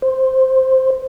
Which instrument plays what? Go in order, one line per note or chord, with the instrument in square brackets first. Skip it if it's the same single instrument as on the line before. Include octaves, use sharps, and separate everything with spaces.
[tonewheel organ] C5